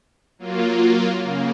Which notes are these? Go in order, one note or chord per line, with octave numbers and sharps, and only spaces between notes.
F#3 A#3 F4
C#3 A#3